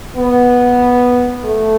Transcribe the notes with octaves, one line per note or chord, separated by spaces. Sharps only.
B3
A3